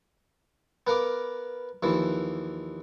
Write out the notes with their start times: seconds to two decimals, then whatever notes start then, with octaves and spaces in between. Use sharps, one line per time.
0.87 B3 A#4 F5 D6
1.83 D#2 E3 F3